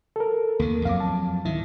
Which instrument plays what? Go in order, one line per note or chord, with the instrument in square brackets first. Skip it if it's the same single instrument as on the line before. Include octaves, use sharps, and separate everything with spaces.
[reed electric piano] A4 A#4
[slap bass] D#2 D#3 [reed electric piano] A#3
[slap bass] F2 F#3 [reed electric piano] F5 D6
[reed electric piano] A5
[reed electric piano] D2 G#2 E4 [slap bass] D#3